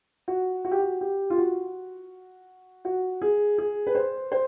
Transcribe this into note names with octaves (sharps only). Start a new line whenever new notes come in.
F#4
F#4
G4
F#4
G4
F4
F#4
F#4
G#4
G#4
B4
C5
C5